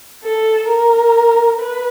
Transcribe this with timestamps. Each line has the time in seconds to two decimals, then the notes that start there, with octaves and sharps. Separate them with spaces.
0.24 A4
0.68 A#4
1.59 B4